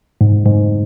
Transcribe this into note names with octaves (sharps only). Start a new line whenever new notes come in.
G#2
G#2